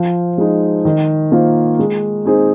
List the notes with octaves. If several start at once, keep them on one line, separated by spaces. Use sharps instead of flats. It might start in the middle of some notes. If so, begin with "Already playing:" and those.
Already playing: F3
G#3 D#4
D#3
A#3 F4 C5
G#3
C4 D#4 G#4